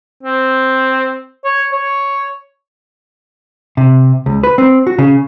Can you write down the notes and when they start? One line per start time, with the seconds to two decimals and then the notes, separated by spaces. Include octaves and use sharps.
0.23 C4
1.44 C#5
1.72 C#5
3.77 C3
4.26 C#2
4.43 B4
4.58 C4
4.87 F#4
4.98 C#3